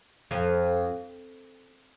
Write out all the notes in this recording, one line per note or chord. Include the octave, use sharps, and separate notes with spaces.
F2